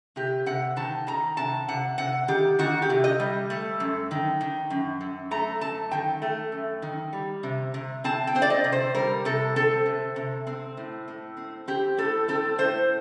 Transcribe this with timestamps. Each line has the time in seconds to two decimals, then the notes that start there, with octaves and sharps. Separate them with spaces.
0.16 C3 G4
0.46 C3 F#5
0.76 D#3 A5
1.07 D#3 A#5
1.37 C3 A5
1.68 C3 F#5
1.98 C3 F#5
2.28 D#3 G4
2.59 D#3 F#4
2.82 G4
2.90 C3
3.04 D#5
3.20 G3
3.50 A3
3.80 F#2
4.11 D#3
4.41 D#3
4.70 F#2
5.01 F#2
5.31 A3 A#5
5.61 F#2 A5
5.91 D#3 G5
6.22 A3
6.52 F#2
6.82 D#3
7.13 G3
7.43 C3
7.74 C3
8.04 C4 A5
8.27 G5
8.35 C4 C5
8.42 D5
8.50 D#5
8.64 C3
8.72 C5
8.94 G3 A#4
9.25 C3 A4
9.56 C4 A4
9.86 C3
10.16 C3
10.47 C4
10.77 A2
11.08 A2
11.37 C4
11.68 C4 G4
11.97 A2 A4
12.28 C4 A4
12.58 A2 C5